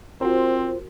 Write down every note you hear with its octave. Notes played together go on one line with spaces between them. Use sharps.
C4 F4 F#4 A#4 C5